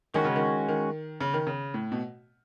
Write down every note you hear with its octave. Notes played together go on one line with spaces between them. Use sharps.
D#3 G#3 C#4 F#4
C#3
D#3
D#3
C#3
D#3
C#3
A2
B2